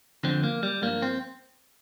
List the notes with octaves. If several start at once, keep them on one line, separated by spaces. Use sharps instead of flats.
F2 D3 F3 C4
A#3
G3
G2 F3 A#3
C4